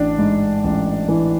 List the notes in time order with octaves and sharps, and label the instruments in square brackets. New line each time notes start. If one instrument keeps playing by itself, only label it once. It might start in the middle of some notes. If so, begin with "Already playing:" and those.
Already playing: [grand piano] A1 D4
G#2
A1
E3